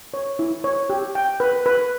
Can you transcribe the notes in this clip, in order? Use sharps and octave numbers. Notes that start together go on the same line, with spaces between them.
C#5
E4
C#5
G4
G5
B4
B4